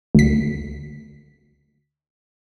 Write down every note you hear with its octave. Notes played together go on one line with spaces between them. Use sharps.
D2 B6